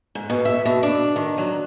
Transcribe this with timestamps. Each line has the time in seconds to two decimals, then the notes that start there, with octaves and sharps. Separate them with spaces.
0.15 G#2
0.30 B2
0.45 E5
0.65 B2
0.83 D4
1.16 D#3
1.38 F#3